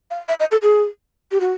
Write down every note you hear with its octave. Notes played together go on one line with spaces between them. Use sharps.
F5
E5
D#5
A4
G#4
G4
F#4